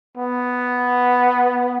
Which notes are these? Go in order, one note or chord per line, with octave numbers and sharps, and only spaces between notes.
B3